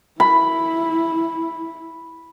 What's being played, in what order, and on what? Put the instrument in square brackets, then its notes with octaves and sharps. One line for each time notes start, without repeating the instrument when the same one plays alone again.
[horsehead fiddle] E4 [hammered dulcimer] B5